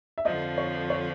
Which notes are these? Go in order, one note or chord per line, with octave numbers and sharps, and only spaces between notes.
E5
F2 D3 F3 D#5
C#5
C#5